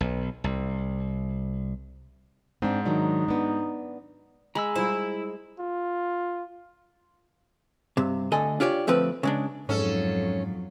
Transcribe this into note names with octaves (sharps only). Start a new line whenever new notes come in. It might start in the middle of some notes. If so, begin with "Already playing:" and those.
B1
C2
G#2 C4 D4
D#3 F#3 D4 D#4
B3 D4
G#3 A#5 B5 E6
G3 E4 F4 C5
F4
G2 C3
D2 D3 A4 D#5 G#5
D4 F4 G4 C#5 D5
D2 F3 A3 C4 B4
C#3 G#3 D4
F2 G#2 F#3 C#4 A4